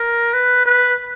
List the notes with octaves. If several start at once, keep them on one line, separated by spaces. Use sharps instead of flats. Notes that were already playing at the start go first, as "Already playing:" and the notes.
Already playing: A#4
B4
B4